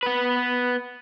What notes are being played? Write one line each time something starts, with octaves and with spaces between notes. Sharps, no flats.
B3 B4